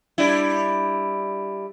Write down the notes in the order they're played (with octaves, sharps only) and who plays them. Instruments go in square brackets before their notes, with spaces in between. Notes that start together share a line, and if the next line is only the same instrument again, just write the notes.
[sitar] G3 D4 E4